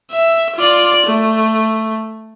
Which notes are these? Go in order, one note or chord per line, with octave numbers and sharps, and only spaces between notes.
E5
F4 D5
A3